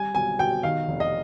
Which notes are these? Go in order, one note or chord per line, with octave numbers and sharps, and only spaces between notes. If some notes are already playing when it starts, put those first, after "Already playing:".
Already playing: G3 G#5
B1 G#5
B2 G5
D#3 F5
F1
D#5